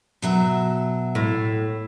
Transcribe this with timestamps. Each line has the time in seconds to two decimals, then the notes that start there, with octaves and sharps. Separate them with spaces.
0.22 B2 F#3 E5
1.15 A2